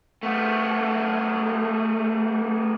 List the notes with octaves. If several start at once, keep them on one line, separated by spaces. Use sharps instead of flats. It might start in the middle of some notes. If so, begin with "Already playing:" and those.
A3 B3